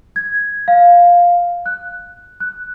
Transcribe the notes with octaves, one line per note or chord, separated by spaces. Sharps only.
G#6
F5
F#6
F#6